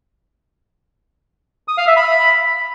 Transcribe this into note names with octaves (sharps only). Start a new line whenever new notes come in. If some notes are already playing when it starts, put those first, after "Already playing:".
D#6
F5
E5
B5